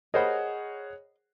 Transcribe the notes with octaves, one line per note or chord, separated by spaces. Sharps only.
G#4 A#4 C5 C#5 D#5 F#5 B5